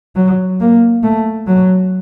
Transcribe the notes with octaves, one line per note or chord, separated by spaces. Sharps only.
F#3
A#3
A3
F#3